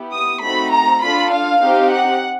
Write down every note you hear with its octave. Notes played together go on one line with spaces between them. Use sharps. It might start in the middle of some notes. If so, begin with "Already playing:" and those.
Already playing: B3 E4 G4
D#6
A3 C4 D#4 F#4 A4 B5
A#5
D4 F4 A4 B5
F5
C4 D#4 G4
F#5